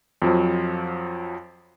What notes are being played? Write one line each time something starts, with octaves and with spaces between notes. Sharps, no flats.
F2 F3 F#3